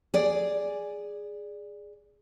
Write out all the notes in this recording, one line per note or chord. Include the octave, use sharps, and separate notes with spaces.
G#4 D5